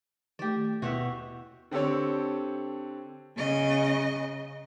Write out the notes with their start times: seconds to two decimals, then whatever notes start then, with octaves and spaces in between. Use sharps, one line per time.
0.39 D#3 A3 G4 D5
0.82 D#2 B2 E4 F#4 C#5 E5 G6
1.71 D3 C4 G4 A4 C#5
3.36 C#3 D#5